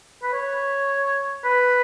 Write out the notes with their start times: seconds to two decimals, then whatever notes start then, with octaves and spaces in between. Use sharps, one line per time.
0.22 B4
0.33 C#5
1.44 B4